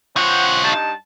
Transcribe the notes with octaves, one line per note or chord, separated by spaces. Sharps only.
F3 C4 F4 C#5 F#5
G2 D#4 A5